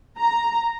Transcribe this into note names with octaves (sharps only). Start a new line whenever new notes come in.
A#5